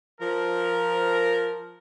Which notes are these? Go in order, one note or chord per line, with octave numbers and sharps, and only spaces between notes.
F3 A#4